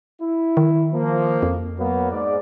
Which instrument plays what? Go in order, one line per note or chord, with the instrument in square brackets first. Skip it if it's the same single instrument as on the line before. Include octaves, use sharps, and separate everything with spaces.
[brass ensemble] E4
[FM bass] D#3
[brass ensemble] F3 A#3
[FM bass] F2
[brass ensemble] F#3 A#3 B3
G#2 D5